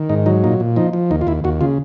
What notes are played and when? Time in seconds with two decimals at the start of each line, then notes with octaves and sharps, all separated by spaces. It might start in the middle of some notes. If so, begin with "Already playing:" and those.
Already playing: D#3
0.09 G#2 D#4
0.26 F#3 D#4
0.44 A#2 D#4
0.60 A#2
0.76 F3 D#4
0.93 F3
1.11 D#2 D#4
1.21 F4
1.27 D#2 E4
1.44 D#2 F#4
1.61 C#3 F4